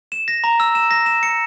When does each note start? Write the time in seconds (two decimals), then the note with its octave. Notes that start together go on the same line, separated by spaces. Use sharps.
0.12 E7
0.28 A#6
0.44 A#5
0.60 E6
0.75 E7
0.91 A#6
1.06 E7
1.23 C#7